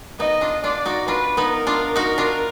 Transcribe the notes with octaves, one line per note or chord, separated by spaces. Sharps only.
B3 D#4 D#5
D4 F4
D4 F4 D5
D#4 F#4
D4 F4 B4
B3 D#4
A#4
D4 F4
D#4 F#4
D4 F4